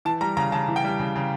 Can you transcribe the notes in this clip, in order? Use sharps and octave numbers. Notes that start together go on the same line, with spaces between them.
E3 A5
G3 A#5
C#3 A#5
C#3 A5
E3
G5
G3
C#3
C#3